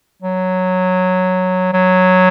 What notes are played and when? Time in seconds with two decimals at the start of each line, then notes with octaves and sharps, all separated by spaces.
0.23 F#3
1.73 F#3